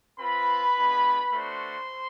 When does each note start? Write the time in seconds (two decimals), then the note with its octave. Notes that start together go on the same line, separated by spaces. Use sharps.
0.18 C4 F4 B4 B5
0.76 G#3 B3 D4 F4
1.32 A3 D4 F#4 C5 C6